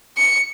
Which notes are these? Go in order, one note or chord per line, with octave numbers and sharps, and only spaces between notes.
C#7